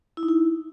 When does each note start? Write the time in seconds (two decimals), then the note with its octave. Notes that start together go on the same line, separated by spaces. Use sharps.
0.17 E4
0.23 D#4
0.28 E4